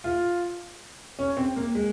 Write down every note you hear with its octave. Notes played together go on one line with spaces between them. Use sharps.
F4
C#4
C4
A#3
G#3